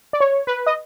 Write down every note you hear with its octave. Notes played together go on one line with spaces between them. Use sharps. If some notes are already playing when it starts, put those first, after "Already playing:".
D5
C#5
B4
D#5